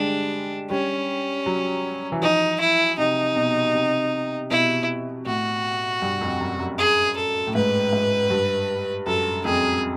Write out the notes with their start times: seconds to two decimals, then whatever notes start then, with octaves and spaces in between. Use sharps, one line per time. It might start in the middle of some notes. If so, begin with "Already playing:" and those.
Already playing: D3 G3 G#3 D4
0.70 G3 C#4
1.46 F#3
2.12 E3
2.22 F3 D#4
2.60 E4
2.98 C3 D#4
3.36 B2
3.74 C3
4.50 B2 E4
5.26 A2 F#4
6.02 G2
6.21 F2
6.40 F#2
6.59 F#2
6.78 G#4
7.16 A4
7.47 A2
7.55 G#2 B4
7.93 G#2
8.30 G2
9.06 F#2 A4
9.45 F2 G#4